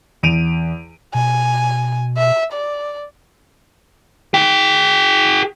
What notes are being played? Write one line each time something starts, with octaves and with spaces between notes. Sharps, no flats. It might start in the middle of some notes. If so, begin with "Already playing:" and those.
E2 D7 D#7 F7
B2 G#5
E5
D5
G#4 G5